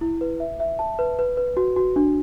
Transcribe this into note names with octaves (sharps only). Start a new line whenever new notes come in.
E4
B4
E5
E5
A5
B4
B4
B4
F#4
F#4
D4